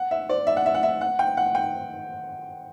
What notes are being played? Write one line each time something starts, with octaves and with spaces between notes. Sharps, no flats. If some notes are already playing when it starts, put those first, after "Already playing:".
Already playing: F#5
E5
D5
E5
F#5
E5
F#5
E5
F#5
G5
F#5
G5